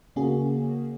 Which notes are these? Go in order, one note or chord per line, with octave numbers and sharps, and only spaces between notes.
C#3 A#3 C#4 F#4 G#4